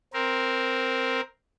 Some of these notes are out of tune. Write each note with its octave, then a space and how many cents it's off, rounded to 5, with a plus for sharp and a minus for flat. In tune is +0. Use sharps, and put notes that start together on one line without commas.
C4 +0 A#4 +0